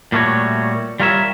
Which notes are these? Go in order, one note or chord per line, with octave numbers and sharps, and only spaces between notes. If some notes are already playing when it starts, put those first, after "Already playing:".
A#2 G3 A3 F#4 C#5
G3 F4 A#4 C#5 E5